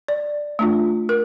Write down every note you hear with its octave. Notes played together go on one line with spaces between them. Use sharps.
D5
A3 D4 F4
A#4